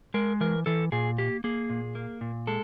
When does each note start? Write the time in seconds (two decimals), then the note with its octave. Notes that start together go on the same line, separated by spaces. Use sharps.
0.14 G#3 A#4
0.41 E3 A#4
0.66 E3 A4
0.92 A#2 G#4
1.18 A#3 G4
1.44 A#3 G#4
1.70 A#2
1.95 A#3
2.21 A#2
2.47 G#3 A4